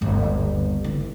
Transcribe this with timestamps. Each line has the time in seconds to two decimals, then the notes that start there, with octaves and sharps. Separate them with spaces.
0.01 G1 D#2
0.84 E3 D#4